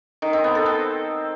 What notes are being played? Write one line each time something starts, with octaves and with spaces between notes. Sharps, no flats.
D#3
C4
B3
A4
C4